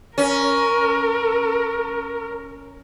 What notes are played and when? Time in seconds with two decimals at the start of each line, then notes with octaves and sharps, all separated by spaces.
0.18 C#4 A#4